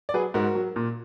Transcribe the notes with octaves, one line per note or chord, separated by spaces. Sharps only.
D5
F#3 G#4 B4
G#2 F#4 A#4
F#3
A#2